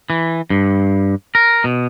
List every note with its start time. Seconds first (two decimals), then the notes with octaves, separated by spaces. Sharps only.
0.10 E3
0.50 G2
1.35 A#4
1.64 B2